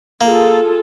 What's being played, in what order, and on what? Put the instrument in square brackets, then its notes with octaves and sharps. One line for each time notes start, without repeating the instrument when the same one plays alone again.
[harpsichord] A#3 [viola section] F4 G#4 A4